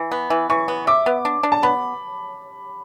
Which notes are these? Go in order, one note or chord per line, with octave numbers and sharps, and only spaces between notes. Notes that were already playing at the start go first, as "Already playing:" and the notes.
Already playing: E3
B3
E3
E3 C#6
B3
E5 D6
B3
D4
D4
A5
B3 B5